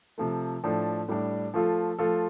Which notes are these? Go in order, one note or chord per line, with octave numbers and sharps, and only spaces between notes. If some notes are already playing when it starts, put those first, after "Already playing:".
C3 F3 A3
A2 F3 D4 A4
A2 G3 D4
F3 A3 F4 A4
F3 A3 F4 A4